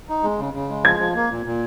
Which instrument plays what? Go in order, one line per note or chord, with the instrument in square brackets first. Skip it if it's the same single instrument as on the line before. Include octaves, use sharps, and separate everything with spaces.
[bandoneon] D#4
G#3
C#3
C#3
G#3
[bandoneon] F3 [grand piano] G#6
[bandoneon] F3
A#3
A#2
A#2